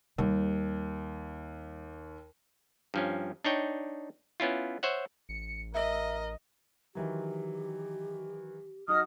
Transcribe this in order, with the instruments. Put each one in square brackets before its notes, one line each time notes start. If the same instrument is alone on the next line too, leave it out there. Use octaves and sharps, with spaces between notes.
[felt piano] D#2 [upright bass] G3
[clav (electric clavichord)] G2 F3 C#4
D4 D#4 C#5 G5
B3 C#4 E4 F4
C5 C#5 E5 F#5
[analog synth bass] A1 [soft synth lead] C#7
[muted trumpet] A#4 [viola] D#5 [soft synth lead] E5
[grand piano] D#3 E3 F#3 [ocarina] G4
[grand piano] F#3 D#4 F#4 [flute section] D#5 F6 [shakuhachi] D#6